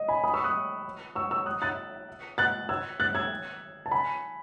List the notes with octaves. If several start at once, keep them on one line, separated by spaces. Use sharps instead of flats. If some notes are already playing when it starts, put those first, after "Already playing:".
Already playing: D#5
G#5 B5
B5 D#6
C#6 E6
D#6 F#6
C#6 E6
C#6 E6
D#6 F#6
F#6 A6
F#6 A6
E6 G#6
F#6 A6
E6 G#6
A5
G#5 B5